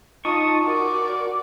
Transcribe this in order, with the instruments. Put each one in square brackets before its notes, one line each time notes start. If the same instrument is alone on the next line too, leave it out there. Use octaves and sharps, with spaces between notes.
[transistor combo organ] D#4 A5 D#6 [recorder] F4 [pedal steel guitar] C#6
[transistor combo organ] F#4 [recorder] A#4 [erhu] D5